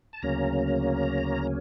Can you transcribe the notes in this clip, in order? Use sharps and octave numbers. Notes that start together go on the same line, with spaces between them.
A5
D2 C#3 F#3 A#3 C#4 A#5